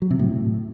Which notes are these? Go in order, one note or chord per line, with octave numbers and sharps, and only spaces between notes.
F#3
C3
A2